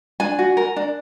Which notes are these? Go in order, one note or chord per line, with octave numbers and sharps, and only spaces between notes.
D4 G#5
F#4
A#4
D4